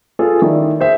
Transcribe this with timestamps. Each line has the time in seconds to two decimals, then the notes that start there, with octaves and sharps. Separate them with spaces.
0.19 F4 G#4 A4 B4
0.42 D#3 E4 D5
0.80 G#4 C5 E5